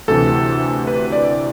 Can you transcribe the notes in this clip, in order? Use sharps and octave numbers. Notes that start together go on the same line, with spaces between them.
D2 C3 E3 A4
B4
D5